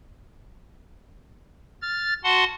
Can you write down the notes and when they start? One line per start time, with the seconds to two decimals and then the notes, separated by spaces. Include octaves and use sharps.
1.82 F6 A6
2.24 F#4 F#5 A5 C6